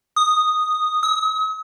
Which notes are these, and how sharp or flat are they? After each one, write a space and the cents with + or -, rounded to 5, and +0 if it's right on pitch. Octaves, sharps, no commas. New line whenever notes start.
D#6 -15
D#6 +45